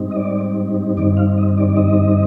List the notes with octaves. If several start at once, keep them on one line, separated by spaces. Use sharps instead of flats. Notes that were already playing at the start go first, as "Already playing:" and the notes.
Already playing: G#2 G3 C4 D#4
D#5
D5
G2 D#3 G3 C4 D#4 D5
F5
D#5
D5
D5
D#5